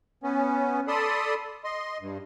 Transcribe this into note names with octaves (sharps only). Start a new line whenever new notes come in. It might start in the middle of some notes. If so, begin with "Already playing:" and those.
B3 C#4
A4 D5 A5 B5 C6 D#6
D#5 C6
G2